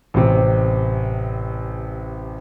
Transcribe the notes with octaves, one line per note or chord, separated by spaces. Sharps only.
A1 C3